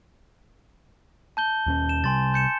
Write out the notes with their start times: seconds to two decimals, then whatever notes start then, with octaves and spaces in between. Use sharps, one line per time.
1.37 A5 G6 G7
1.67 D#2 A#3 C#4
1.89 E7
2.04 C3 G3 G#5 C6 A6
2.34 G6 C#7 E7